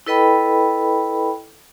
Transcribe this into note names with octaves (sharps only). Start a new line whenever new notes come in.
E4 A4 B4 D#5 G5 B5